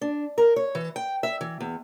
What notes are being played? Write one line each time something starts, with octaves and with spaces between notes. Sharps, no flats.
D4
A#4
C#5
E3
G5
E5
E3
E2